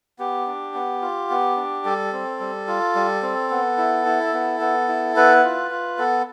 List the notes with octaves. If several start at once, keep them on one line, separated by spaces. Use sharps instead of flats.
B3 G4
D4
B3
F4
B3
D4
G3 A4
C4
G3
F4
G3
C4
B3
E4
E4
B3
B3
E4
B3 B4
F4
F4
B3 A4